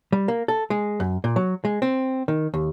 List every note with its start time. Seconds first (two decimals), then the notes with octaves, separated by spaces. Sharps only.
0.12 G3
0.28 A#3
0.48 A4
0.70 G#3
1.00 F#2
1.24 A#2
1.36 F#3
1.65 G#3
1.82 C4
2.28 D#3
2.54 D#2